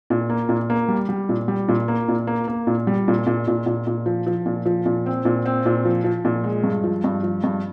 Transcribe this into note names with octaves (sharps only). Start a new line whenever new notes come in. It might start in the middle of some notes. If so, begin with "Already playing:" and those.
A#2
A#3
A#2
A#3
G3
G3
A#2
G3
A#2
A#3
A#2
A#3
A#3
A#2
G3
A#2
A#2
A#2
A#2
A#2
F3
F3
A#2
F3
A#2
C4
A#2
C4
A#2
F3
F3
A#2
G#3
G2
F3
G2
F3
G2